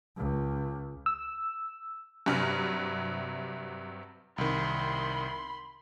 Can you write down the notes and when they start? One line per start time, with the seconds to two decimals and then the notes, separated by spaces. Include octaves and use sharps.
0.17 C#2
1.06 E6
2.26 G2 C3 F#3 E5 F6
4.38 C2 D#3 B5 C6